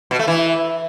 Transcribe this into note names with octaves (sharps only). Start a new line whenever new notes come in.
B2
A3
E3